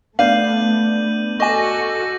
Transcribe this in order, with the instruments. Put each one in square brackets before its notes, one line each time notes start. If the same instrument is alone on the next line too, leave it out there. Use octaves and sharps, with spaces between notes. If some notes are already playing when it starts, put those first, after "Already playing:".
[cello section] A3 [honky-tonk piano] B3 D4 [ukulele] F5 [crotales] G6 D#7 F#7
[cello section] F#4 A4 [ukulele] D#5 G#5 [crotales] C#6 D6 A#6